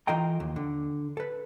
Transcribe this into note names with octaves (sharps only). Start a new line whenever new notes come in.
E3 F4 A4 D#5 G5 A#5
D#2
D3
A4 B4